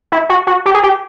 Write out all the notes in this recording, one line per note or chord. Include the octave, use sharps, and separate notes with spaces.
E4
F#4
F#4
G4
G#4
G4